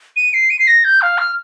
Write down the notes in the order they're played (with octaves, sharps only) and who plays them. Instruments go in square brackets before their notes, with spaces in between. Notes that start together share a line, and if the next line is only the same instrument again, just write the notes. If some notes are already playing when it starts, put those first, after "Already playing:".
[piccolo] D#7
C7
D#7
C7
A#6
G6
F5
F6